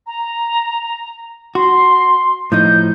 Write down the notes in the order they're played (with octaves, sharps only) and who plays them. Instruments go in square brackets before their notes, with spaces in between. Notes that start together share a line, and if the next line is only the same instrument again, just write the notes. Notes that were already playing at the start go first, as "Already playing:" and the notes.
[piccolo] A#5
[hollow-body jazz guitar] F#4 [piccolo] C6
[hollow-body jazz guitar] A2 F3 D#4 [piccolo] G6